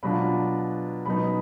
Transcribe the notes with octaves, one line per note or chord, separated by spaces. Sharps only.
B2 F#3 D4 F4 B5
B2 F#3 B3 D#4 B5